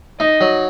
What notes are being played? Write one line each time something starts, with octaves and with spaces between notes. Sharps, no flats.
D#4 D#5
F#3